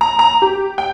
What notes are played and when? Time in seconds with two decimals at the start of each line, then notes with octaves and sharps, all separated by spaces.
0.01 A#5
0.19 A#5
0.42 G4
0.78 G5